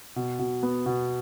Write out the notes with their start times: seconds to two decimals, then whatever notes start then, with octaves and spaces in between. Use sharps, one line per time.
0.16 B2
0.39 B2
0.63 B3
0.86 B2